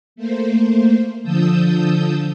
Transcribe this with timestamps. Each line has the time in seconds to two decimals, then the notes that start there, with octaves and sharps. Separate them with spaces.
0.16 A3 A#3 C5
1.22 D3 F3 A5 D#6 E6 G6